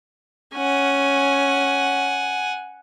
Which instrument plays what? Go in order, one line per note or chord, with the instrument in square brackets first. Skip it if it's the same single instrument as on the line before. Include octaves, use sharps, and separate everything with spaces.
[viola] C#4 [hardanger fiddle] F#5 G#5